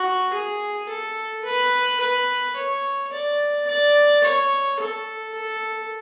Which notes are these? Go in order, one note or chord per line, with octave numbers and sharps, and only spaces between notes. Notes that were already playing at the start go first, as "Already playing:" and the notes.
Already playing: F#4
G#4
A4
B4
B4
C#5
D5
D5
C#5
A4
A4